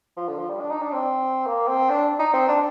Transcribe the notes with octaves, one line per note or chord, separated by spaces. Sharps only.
F3
D3
F3
G3
D4
D#4
D4
C4
A#3
C4
D4
D#4
C4
D4